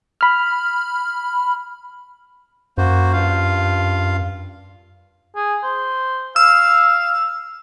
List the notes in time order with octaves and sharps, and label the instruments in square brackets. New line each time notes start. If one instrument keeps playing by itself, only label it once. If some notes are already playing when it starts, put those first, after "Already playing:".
[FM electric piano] B5 F6
[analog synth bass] F#2 [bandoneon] A#3 F#4 C5
[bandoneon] G2 F4 F5
[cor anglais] G#4
C5
[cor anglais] F5 [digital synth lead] E6